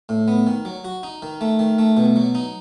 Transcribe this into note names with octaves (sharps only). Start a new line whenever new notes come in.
A2
B3
D#3
F#3
F#4
D#4
D#3
A3
D#3
A3
B2
F#3
D#4